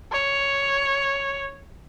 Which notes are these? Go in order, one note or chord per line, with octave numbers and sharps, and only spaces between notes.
C#5